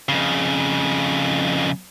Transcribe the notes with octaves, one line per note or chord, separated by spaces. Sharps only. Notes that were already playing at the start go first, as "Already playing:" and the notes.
F2 C#3